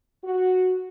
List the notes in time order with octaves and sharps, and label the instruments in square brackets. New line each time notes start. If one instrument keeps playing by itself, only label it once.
[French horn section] F#4